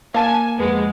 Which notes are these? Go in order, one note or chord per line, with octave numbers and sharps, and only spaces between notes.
A#3 F5 G#5 A5
F2 G#3 B3